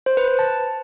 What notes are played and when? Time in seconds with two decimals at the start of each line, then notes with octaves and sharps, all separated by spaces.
0.06 C5
0.17 B4
0.28 B4
0.39 A5